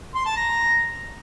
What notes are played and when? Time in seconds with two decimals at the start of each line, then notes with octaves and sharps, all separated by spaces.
0.15 C6
0.26 A5
0.37 A#5